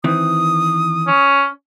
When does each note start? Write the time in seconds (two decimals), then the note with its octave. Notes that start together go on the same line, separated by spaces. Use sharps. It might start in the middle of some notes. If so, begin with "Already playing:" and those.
0.04 D#3 E3 C4 D#6
1.07 C#4